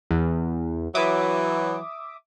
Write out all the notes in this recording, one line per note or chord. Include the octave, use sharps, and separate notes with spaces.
E2
E3 F#3 E5 D6 D#6